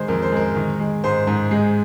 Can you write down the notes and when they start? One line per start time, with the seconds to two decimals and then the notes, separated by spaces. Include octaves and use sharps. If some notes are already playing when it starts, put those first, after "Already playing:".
Already playing: D#3 G#3 C5
0.08 F2 A#4
0.23 C5
0.32 G#3 A#4
0.56 D#3
0.80 G#3
1.04 G#2 C5
1.27 G#2
1.51 G#3